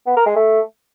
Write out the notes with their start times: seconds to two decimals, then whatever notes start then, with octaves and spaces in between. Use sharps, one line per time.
0.06 B3
0.16 A#4
0.26 G#3
0.36 A3